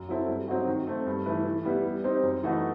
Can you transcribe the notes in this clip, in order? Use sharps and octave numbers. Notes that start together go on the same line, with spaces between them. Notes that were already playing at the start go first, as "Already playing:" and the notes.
Already playing: F#2
F#3 C4 E4 A4
G2
F#3 C4 D#4 F#4
D#3
A3 C4
G2
E3 A3 E4 B4
E3
G3 B3 E4
G3
C4 D#4 G4 C5
F#2
E3 A3 D#4 F#4